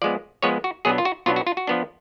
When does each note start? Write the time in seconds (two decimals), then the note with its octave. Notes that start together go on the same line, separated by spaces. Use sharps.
0.02 F3 G#3 B3 D5
0.42 F3 G#3 B3 C#5
0.64 F#4
0.85 B2 F#3 B3 D4 G#4
0.98 F4
1.05 F#4
1.26 B2 F#3 B3 D4 F4
1.36 F#4
1.47 F4
1.57 F#4
1.67 F3 B3 D4